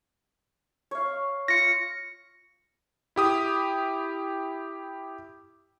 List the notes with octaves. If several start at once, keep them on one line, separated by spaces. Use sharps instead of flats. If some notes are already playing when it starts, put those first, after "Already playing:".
C#5 F5
F4 A#6 C#7
E4 G4 D#6